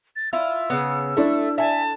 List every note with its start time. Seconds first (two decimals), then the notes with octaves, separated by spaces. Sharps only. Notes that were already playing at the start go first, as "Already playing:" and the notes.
0.16 A6
0.33 E4 F4 E6
0.70 C#3 B3
1.17 A3 D4 E4 A4
1.58 E5 G#5 A5